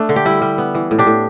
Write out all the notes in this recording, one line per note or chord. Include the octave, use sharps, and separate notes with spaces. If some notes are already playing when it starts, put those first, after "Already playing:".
Already playing: A3 D4
D3
G4
G3 E4
G3
B3
E3
A2
D4 G4
A2